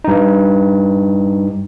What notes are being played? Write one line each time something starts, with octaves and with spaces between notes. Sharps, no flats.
G2 D#4